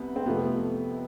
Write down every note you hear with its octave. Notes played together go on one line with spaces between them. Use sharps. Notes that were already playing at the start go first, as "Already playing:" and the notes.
Already playing: C2 C3 B3
C4
F2 C3 F3 A3 B3